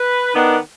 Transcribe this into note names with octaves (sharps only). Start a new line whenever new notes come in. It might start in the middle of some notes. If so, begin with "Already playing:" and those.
Already playing: B4
D#3 B3 D4